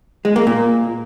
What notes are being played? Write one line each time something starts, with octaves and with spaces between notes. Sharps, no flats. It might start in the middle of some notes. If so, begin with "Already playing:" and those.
G#3
A#3
A#2